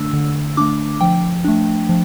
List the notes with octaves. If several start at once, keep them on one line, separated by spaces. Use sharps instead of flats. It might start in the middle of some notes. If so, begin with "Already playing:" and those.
Already playing: D3 A3 D4 E6
D3
A3 D4 D6
F3 G5
A3 D4
F3